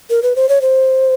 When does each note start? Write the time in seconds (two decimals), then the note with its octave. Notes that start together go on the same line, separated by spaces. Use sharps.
0.10 A#4
0.23 B4
0.36 C5
0.49 C#5
0.62 C5